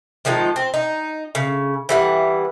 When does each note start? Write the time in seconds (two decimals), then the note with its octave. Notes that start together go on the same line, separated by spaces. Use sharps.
0.25 D#3 F3 G#3 D#4
0.56 C4
0.74 D#4
1.35 C#3
1.89 E3 G3 F#5